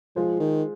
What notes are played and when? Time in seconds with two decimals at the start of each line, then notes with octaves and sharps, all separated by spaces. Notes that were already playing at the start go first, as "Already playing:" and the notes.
0.16 F3 G#3 F4 C5
0.40 D#3